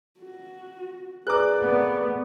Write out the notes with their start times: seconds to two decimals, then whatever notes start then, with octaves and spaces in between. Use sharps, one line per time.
0.20 F#4
1.27 A#3 G#4 B4 D5 A#5 D6 F#6
1.59 A3 B3